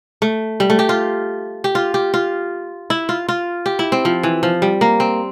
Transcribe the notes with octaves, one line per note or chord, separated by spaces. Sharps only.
A3
G3
A3
G4
F4
G4
F4
G4
F4
E4
F4
F4
G4
E4
C4
F3
E3
F3
G3
A#3
C4